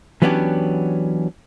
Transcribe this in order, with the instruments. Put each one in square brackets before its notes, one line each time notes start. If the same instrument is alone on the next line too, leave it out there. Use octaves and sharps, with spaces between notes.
[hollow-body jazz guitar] E3 F#3 B3 C#4 D4 G4